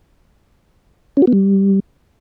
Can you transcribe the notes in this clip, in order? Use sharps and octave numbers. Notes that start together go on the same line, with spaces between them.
C#4
F#4
B3
G3